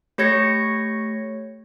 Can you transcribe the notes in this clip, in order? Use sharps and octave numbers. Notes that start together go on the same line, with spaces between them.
A3 G4 C#5 G#6 A#6 C#7